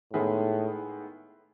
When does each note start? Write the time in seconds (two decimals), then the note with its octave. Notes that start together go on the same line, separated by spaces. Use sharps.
0.13 A2 D#3 G#3 B3 E4 G#4